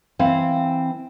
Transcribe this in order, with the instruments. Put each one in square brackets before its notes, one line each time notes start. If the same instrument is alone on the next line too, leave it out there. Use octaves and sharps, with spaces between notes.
[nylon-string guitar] E3 C4 F5